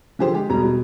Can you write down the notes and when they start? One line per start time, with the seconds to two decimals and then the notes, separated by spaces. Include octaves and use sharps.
0.19 D3 F3 G4 G#4 C5
0.34 G#3 G4
0.49 E1 B2 G3 A#5
0.65 B2